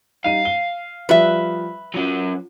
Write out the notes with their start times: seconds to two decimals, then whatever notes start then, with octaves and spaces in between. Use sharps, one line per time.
0.25 G3 D#4 F5 D#7
0.45 G7
1.09 F3 G3 B4 D5 E5
1.94 F#3 C#4 F4